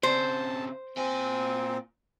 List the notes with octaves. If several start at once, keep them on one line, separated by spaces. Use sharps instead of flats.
C#3 C4 C5 A5
A#2 C4 G#5